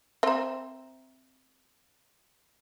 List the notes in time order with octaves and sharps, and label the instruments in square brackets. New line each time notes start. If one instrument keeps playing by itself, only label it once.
[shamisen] C4 C5 [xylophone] E5 A#5